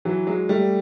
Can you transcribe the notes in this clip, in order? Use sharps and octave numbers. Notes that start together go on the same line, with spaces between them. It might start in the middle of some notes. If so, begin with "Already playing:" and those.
E3 F#3
F#3 G#3
G3 A3